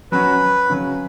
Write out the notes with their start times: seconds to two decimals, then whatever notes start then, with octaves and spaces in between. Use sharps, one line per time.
0.12 F#3 C#4 F#4 B4
0.70 C#3 F#3 C#4